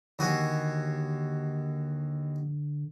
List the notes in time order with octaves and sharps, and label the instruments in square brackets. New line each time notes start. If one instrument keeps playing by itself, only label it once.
[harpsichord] D#2 F#4 G#5 [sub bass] D3